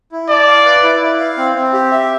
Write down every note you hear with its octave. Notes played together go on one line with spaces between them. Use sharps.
E4
D5 A5
F5
B4
E4
E4
F5
C4
C4
G4
E5